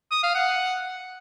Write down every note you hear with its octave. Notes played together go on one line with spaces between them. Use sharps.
D#6
F5
F#5